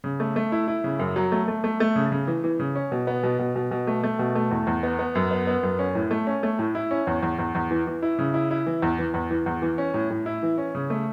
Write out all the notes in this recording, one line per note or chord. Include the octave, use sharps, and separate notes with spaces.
C#3
A3
A3
E4
E4
C#3
F#2
F#3
A3
A3
A3
A3
C#3
C#3
E3
E3
C#3
C#4
B2
B3
B2
B2
B2
B2
A3
A3
B2
A3
E2
E2
B3
B3
F#2
B3
B3
F#2
C#4
A2
A3
C#4
A3
A2
E4
C#4
E2
E2
E2
E2
E3
E3
E4
C#3
E4
E4
E3
E2
E3
E2
E3
E2
E3
C#4
A2
A2
E4
E3
C#4
C#3
A3